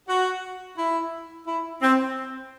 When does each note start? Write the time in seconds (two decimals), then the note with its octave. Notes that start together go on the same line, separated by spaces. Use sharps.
0.08 F#4
0.78 E4
1.47 E4
1.82 C4